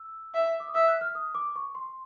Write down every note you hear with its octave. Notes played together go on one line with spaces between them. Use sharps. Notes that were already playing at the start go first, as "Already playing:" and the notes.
Already playing: E6
E5
D6
D#6
E5 E6
F#6
F6
D#6
D6
C#6
C6